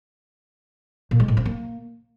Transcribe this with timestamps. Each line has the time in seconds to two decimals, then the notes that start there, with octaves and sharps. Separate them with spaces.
1.11 A#2
1.20 G#3
1.28 A2
1.37 C4
1.46 A#3